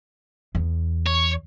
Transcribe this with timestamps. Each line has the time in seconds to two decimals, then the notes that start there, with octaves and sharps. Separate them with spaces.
0.55 E2
1.06 C#5